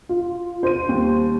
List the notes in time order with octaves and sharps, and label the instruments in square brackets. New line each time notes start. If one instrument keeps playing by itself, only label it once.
[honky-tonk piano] F4
C5 D#7
[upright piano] D#2 G3